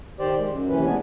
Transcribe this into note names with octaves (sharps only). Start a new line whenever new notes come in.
D#3 G4 C5 D5
G#3
F#2
D#2 C3 E3 C#4 B4
D#2 G#3 B3 D4 G#5